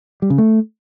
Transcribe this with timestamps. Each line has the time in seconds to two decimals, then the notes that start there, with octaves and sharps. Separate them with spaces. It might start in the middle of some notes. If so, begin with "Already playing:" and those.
0.22 G3
0.30 C#3
0.38 A3